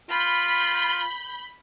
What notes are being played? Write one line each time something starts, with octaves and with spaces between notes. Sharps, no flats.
F4 B5 G6